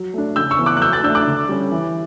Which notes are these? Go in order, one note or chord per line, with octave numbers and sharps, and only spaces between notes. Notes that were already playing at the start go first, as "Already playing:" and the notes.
Already playing: F#3
A3 D4
C#3 E6 G6
C#6 E6
E3 B3
D6 F#6
F#6
F#3 E6 G6
F#6 A6
A3 D4 E6 G6
D6 F#6
D3
G3 C#4
E3